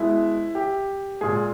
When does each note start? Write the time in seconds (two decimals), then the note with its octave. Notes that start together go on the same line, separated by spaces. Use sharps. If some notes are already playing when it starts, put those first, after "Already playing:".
Already playing: B2 G#3 E4
0.55 G4
1.21 A#2 G#3 G#4